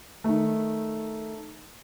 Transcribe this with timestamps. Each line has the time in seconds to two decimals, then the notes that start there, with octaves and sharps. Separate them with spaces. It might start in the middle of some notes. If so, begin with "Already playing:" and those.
0.24 D#3 A3